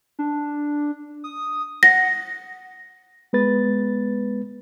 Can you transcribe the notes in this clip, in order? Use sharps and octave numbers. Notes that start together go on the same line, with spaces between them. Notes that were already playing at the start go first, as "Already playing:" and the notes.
D4
D#6
F#5 A#6
G#3 B3 B4 A6